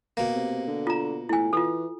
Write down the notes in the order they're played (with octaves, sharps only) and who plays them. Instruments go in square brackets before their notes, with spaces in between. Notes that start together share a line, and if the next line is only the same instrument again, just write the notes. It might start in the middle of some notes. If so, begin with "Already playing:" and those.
[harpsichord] B2 A#3
[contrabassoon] C3
D3
[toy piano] F4 A#5
[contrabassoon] A2 [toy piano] E4 G#5
[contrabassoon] E3 [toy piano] F4 A4